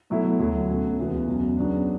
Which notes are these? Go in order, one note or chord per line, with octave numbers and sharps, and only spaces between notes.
B2 F#3 A3 E4
D2 D3 F#3 A3
B2 A3 C#4 F#4
C#2 C#3 E3 B3 F#4
E2 B2 F#3 C#4
C#3 F#3 B3 D4